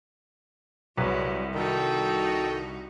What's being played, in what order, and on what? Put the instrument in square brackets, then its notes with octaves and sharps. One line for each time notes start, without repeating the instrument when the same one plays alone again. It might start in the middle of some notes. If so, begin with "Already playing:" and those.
[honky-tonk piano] C2 [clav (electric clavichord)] F#3 B4 [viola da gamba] G#3
[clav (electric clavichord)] D#3 [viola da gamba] D#4 F#4 [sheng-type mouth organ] A4 G5